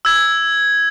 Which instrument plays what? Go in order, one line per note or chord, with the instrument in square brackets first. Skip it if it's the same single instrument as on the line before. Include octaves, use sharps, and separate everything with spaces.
[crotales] E6 G#6